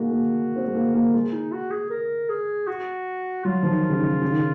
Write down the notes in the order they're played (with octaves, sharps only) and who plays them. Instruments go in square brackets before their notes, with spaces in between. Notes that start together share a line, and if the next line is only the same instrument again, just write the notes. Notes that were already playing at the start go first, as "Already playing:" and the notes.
Already playing: [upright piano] G#3 A#3 [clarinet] F#4
[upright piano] A#3
C4
G#3
A#3
A#3
[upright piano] G#3 [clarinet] F4
[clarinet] D#4
F#4
G#4
A#4
G#4
F#4
[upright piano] F#3 [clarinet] F4
[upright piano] F3
D#3
C#3
D#3
C#3
D#3
C#3